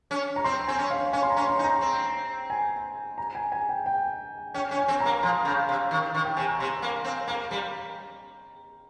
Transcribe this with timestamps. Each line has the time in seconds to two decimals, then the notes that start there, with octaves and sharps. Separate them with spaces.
0.11 C#4
0.36 A#5
0.44 C4 C6
0.67 C4 G#5
0.78 C#4
0.91 F5
1.13 C#4 G#5
1.23 C6
1.30 A#5
1.36 C#4
1.47 C6
1.59 D#4
1.64 A#5
1.81 C4
2.50 G#5
3.18 A#5
3.35 G#5
3.52 G#5
3.69 G5
3.86 G5
4.54 C#4 G5
4.71 C#4
4.77 G#5
4.88 C4
5.00 A#5
5.06 A#3
5.23 F3 C6
5.45 C#3
5.69 C3
5.91 D#3
6.15 D#3
6.25 G5
6.36 C3 G#5
6.48 A#5
6.60 C3 C6
6.82 A#3
7.05 C4
7.27 A#3 A#5
7.51 G3 A#5